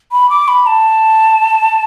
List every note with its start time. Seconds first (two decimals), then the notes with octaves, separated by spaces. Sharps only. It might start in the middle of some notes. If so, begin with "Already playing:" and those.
0.12 B5
0.30 D6
0.48 B5
0.66 A5